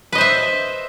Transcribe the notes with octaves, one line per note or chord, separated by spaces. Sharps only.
B4 C5 D#5 E5